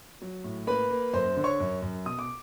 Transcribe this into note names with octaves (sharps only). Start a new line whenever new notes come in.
F#3
A2
A#3 B4 B5
A#3
F#2 C5 C6
D3
C#5 C#6
F#2
F#2
B2 D#6
D6